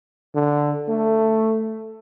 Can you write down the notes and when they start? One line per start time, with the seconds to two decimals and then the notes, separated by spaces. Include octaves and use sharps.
0.35 D3
0.88 A3